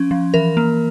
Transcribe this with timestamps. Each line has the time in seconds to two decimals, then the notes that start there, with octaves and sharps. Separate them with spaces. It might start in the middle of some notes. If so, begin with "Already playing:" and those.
Already playing: F3 C#4
0.11 F3
0.34 E3 A#4
0.57 A#3